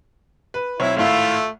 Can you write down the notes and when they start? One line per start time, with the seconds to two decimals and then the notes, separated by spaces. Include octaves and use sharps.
0.54 B4
0.80 B1 C4 E4 C#5
0.97 G#1 A2 A3 F4 E5 F5